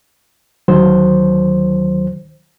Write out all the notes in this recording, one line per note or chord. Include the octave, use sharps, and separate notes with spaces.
D2 D#3 F#3 C5